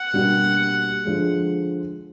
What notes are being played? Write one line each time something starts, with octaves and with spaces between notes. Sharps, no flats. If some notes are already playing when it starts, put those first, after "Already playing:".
Already playing: F#5
B2 G3 A#3 D4
D3 F3 G#3